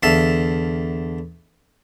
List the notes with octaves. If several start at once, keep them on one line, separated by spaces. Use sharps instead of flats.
E2 D3 E5 F5 A5